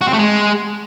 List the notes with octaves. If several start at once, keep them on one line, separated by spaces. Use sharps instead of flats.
F#4
C4
A3
G#3